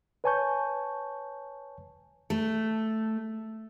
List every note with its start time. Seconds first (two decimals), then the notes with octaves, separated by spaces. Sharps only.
0.24 B4 C#5 G#5 A5 C#6 G6
2.30 A3